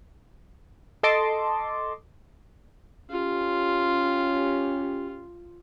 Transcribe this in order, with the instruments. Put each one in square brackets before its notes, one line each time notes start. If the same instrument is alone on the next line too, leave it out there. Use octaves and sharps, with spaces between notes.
[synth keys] A4 D#5 A5 C6 D6
[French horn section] C#4 G4 [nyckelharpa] F4